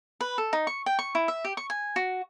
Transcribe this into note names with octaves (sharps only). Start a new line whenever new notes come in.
B4
A4
D#4
C#6
G5
C#6
E4
E5
G4
C#6
G#5
F#4